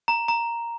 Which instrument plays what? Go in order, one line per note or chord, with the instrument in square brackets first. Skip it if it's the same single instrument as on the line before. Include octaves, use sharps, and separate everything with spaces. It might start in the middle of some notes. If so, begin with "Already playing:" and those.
[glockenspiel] A#5
A#5